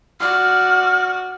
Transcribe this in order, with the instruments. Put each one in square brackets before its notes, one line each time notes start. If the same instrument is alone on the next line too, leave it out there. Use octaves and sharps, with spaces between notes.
[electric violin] F#4 D5 [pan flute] F6